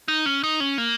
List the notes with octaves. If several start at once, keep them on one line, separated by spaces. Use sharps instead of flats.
D#4
C#4
D#4
C#4
A#3